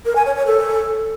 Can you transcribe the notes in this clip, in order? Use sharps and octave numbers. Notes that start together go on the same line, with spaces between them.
A#4
G#5
C#5
C#5
A4